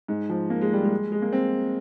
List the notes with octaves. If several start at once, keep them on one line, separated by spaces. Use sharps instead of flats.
G#2
F3
A#3
G#3
G3
G#3
G#3
A#3
C4